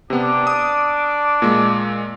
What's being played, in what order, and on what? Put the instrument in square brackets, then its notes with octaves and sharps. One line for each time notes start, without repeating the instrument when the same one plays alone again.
[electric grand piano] C3 B3 [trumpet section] D4 D6
[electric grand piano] D#6
A#2 G#3